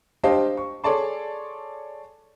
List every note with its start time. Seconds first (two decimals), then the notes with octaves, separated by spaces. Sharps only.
0.23 D4 G4 C5 D#5 F5 A5
0.57 C#6
0.84 G#4 A4 C#5 D5 A5 C6